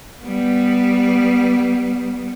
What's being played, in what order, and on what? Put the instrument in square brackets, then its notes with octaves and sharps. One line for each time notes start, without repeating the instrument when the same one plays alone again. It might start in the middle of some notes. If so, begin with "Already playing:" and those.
[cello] G3 B3